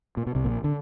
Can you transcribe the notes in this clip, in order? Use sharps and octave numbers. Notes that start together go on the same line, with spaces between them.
A#2
B2
C2 C3
A#1 A#2
D3